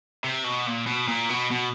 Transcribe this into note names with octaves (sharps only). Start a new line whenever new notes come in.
C3
B2
A#2
B2
A#2
B2
B2